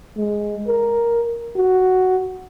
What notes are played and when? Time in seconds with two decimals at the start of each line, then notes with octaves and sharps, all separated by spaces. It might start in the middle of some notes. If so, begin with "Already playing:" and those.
0.17 G#3
0.67 A#4
1.56 F#4